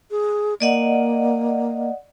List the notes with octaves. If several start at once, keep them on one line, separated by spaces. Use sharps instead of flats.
G#4
A#3 D5 D#5 F#5